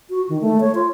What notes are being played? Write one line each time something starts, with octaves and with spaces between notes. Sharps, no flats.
F#4
D#3
A3
C#5
F4